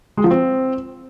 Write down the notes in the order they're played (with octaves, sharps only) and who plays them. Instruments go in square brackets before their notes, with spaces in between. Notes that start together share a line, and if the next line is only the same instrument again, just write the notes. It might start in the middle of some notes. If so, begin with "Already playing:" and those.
[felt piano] G#3
F3
C4